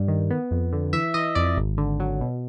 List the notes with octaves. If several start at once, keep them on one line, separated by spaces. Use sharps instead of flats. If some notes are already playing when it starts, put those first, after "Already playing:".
Already playing: G2 G3
D#3
B3
F2
D3
E3 E5
E3 D#5
F2 D5
G#1
D3
F#3
B2